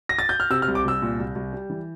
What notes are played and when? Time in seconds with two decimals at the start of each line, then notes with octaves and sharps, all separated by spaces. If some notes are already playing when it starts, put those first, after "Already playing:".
0.09 A#6
0.19 A6
0.29 G6
0.40 F6
0.50 C3 E6
0.62 F6
0.68 C2
0.75 D6
0.84 C2 E6
1.02 A#2
1.19 C2
1.35 C2
1.53 G3
1.70 E3